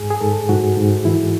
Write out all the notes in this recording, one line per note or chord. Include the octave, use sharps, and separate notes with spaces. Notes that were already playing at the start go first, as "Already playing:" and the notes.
Already playing: G#2 G#4
G#4
G#2 A4
G#2 F#4
G#2
E3 E4